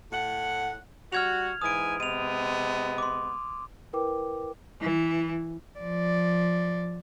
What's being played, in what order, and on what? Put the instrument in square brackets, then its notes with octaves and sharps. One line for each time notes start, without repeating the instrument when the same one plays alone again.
[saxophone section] A2 F#5
[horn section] G3 F#4 [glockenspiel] F6 G#6 F7
[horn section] G#2 E3 G#5 [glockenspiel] D#6 D7
[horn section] C3 G#3 B3 [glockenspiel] D#7 F7
[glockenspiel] C6 D6
[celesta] E4 A#4 B4 G5 D6
[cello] E3
F3 D5